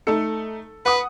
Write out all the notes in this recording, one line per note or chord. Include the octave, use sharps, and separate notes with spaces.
A3 D#4 A4 C#7
B4 F#5 D#6